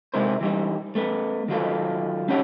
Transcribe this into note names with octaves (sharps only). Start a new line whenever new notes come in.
C3 G#3 D#4 E4 A#4 C5
E3 G3 D#4
A3 B3
D#3 F#3 F4 A4
C#4 D#4 G4 C#5 F#5 A5